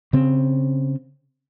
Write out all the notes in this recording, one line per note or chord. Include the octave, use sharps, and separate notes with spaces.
C#3 C4